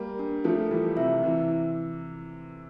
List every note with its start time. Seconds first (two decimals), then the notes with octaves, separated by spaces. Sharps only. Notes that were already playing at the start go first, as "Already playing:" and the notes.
Already playing: G3 A#3
0.19 D4
0.44 F3 A3 A4
0.71 E3 G3 F4
0.97 C3 E3 E5
1.23 C3 E3 E4